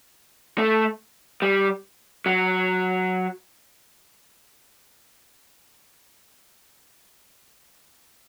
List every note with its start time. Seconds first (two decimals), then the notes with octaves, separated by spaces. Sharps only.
0.58 A3
1.42 G3
2.26 F#3